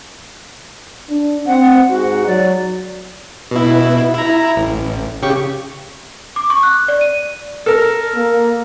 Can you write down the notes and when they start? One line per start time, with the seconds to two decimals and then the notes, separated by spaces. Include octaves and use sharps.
1.09 D4
1.47 C4 F#5
1.89 G#2 F#4
2.27 F#3 D5
3.51 B2 E4
4.14 E4 A#5
4.56 A1
5.22 C#3 G4 C#6
6.36 D6
6.50 C#6
6.63 F#6
6.88 D5
7.01 D#7
7.66 A4 A#4
8.16 A#3